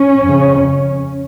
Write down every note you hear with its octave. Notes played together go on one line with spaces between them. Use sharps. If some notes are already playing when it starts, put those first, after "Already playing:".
Already playing: C#4
F2 C#3